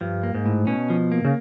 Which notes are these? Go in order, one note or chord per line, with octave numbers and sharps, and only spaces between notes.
G2 F3
A#3
G#2
A2
B2 C#4
F3
A#3
C#3